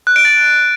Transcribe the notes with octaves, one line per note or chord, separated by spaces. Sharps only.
F#6
D7
A6